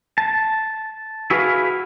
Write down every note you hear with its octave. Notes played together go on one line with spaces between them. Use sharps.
A5
E4 F#4 G#4 B4 D#5 F5